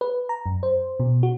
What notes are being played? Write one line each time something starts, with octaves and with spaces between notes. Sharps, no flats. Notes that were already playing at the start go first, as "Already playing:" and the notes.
B4
A#5
F#2
C5
B2
F#4